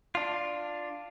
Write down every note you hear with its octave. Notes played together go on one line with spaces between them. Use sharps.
D4 F4